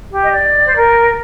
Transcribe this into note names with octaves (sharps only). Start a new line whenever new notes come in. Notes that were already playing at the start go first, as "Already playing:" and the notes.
G4
D#5
D5
C5
A#4